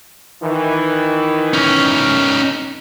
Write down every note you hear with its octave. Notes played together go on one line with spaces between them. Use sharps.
D#3 E3
C#4 D#4